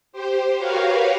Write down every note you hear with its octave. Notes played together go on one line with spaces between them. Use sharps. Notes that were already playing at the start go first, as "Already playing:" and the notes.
G4 C5
F#4 G4 A#4 B4 C#5 F5